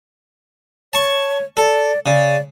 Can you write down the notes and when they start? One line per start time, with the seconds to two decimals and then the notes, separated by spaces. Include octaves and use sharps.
0.93 C#5 A5 C#6
1.57 A4 D5
2.06 C#3 D5